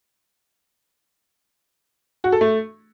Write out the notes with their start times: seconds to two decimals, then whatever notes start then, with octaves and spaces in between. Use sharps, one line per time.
2.24 F#4
2.32 A4
2.41 A3